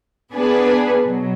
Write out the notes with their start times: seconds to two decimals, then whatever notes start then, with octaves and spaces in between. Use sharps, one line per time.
0.33 B3 D4 G#4 B4
1.03 B2 F#3